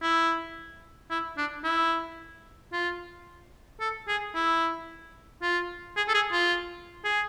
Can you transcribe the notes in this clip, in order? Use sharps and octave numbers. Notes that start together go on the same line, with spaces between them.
E4
E4
D4
E4
F4
A4
G#4
E4
F4
G#4
A4
G#4
F4
G#4